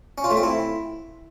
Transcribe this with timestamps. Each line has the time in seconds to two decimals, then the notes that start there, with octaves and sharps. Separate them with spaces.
0.18 C#4
0.24 F4
0.31 A3
0.37 C4
0.43 E4